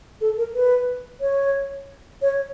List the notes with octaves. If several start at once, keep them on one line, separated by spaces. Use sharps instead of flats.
A4
A#4
B4
C#5
C#5